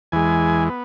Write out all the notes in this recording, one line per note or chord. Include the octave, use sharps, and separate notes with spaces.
E2 E3 G#3 G#5
B3